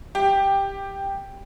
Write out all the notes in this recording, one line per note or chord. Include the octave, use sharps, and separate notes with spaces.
G4